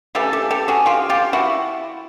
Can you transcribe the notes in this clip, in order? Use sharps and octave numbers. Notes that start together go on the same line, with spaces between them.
C#3 E3 A3 G4 A4
G4 A4
G4 A4
F#4 G#4
F4 G4
F4 G4
E4 F#4